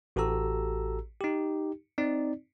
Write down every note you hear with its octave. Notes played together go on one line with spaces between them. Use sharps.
A1 F#4 G4 A4 A#5 E6
D#4 G4
C4 D#4 D5